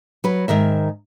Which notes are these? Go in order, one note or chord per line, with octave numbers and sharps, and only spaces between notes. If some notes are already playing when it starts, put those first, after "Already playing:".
F#3 B4
G#2 D#3 A#4 E5